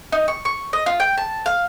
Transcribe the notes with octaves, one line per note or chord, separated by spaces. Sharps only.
D#4
C#6
C#6
D#5
F4
G5
A5
F5